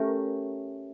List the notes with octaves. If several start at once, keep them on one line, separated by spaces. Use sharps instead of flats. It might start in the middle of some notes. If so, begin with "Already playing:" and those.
Already playing: A3 C#4 G4 A#4